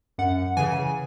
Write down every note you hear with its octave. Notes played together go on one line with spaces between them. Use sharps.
F#2 F#5
C#3 E3 G#5